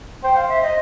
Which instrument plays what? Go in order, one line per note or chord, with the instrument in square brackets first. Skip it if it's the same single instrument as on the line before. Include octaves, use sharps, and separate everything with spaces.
[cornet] C5 [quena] G5
[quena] F5
E5
D#5